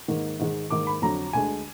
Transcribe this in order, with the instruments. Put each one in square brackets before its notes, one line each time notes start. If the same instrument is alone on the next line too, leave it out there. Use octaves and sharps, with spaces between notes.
[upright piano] G#2 D#3 A#3
G#2 D#3 G#3
G#2 D#3 A#3 D6
B5
F2 D3 F#3 A#5
D2 D3 G#3 G#5